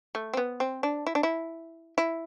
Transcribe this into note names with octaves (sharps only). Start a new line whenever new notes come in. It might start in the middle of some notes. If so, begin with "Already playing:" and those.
A3
C4
B3
C4
D4
E4
D4
E4
E4